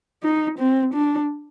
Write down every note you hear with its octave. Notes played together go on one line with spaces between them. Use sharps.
D#4
C4
D4